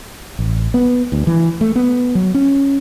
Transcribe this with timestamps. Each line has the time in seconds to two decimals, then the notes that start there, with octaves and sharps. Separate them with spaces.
0.39 A1
0.74 B3
1.12 D2
1.27 E3
1.61 A3
1.76 B3
2.15 F#3
2.34 C#4